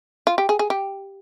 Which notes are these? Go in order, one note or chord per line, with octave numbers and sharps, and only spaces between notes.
F4
G4
G#4
G#4
G4